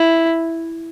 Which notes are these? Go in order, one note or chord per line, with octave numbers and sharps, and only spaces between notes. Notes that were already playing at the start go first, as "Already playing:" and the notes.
Already playing: E4